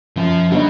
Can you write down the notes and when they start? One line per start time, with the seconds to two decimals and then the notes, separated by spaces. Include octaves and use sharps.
0.17 F#2 F3
0.51 D3 F#3 G3 B3 D#4